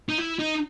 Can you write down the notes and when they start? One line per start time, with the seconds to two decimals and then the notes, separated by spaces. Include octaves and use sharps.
0.09 D#4
0.19 E4
0.39 D#4